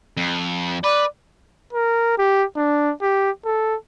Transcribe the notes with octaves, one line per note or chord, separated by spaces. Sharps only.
F2
B4 D5
A#4
G4
D4
G4
A4